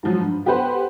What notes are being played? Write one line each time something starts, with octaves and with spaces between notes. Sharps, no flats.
G#2 F3 F#3
G2
B3 G4 A4 B4 C5 F#5